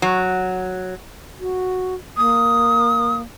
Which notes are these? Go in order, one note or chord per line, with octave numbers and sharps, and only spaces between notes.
F#3
F#4
A#3 D#6